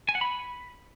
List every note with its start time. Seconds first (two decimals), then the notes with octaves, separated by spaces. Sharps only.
0.09 G#5
0.15 F#5
0.21 B5